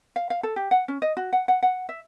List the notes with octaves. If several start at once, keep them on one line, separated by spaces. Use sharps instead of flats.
F5
F5
A4
G4
F#5
C#4
D#5
F#4
F#5
F#5
F#5
E5